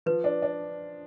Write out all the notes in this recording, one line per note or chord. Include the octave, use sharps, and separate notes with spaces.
F3 B4
D4
D4